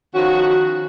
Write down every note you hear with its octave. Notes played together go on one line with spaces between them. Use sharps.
D#3 F3 C#4 F#4